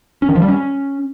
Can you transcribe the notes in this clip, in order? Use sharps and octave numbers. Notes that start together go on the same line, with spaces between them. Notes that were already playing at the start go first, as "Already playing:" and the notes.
C#4
D#3
F3
G3
C#4